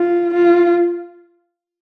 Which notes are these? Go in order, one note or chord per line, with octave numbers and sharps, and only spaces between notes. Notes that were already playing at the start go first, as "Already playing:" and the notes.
Already playing: F4
F4